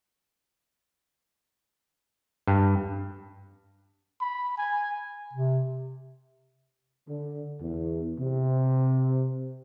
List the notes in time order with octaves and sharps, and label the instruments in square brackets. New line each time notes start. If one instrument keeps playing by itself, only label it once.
[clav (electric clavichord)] G2
[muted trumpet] B5
G#5
[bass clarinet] C3
[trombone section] D3
E2
C3